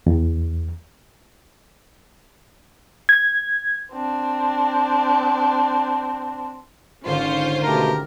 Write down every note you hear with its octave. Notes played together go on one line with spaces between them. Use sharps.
E2
G#6
C4 D4
G#1 D3 C#4 F4 C5
B2 A3 G4 A#4